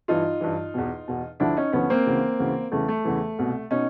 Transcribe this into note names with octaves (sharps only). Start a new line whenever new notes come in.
G2 E3 D#4 F4
G2 E3
E2 B2
E2 B2
D2 D3 F3 D4 E4
C#4 D#4
D2 D3 F3 B3 C#4
A#3 C4
D2 C#3 E3
D2 C#3 E3
E2 C#3 E3 A3
A3
E2 C#3 E3
C2 B2
B2 C#4 D#4